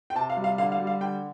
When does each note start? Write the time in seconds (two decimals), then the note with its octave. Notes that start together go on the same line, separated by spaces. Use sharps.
0.10 G5
0.15 C3 A5
0.30 F5
0.37 G3
0.44 F5
0.58 D3 F5
0.72 F5
0.79 G3
0.87 F5
1.01 D3 G5